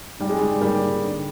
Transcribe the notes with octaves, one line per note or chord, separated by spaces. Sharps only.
G#2 G3
G#3
G#2 G3
G#2 G3 A#3
G#2
D3